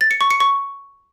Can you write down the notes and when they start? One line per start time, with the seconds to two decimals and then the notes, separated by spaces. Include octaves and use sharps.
0.01 A6
0.11 C#7
0.21 C#6
0.31 C#7
0.40 C#6